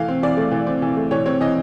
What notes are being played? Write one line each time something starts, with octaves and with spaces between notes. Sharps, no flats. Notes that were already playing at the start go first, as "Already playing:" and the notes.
Already playing: E3 A3 F5
C4
E3 D5
A3
E3
C4
E3
A3
E3 C#5
C4 C#5
E3 D#5